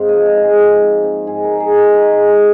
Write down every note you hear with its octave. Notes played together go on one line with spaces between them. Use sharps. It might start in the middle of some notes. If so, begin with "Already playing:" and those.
Already playing: G#2 C4 F5
D#5
F3
D#5
G#2
G#4
G#2
C4
C4
G#2 G#4
A#4
G#3
G#4
D#4
A#4
D#3 F4
G#4
D#3
G#4